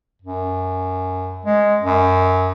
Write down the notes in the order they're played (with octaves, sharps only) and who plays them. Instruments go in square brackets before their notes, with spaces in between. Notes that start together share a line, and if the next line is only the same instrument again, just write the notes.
[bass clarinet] F#2
G#3
F#2